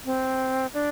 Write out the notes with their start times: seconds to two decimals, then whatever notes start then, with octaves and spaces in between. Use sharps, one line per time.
0.05 C4
0.74 D4